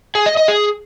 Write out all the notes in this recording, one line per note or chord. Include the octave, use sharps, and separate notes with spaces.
G#4
D#5
D#5
G#4